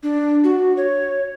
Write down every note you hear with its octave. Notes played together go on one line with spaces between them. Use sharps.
D4
F#4
C#5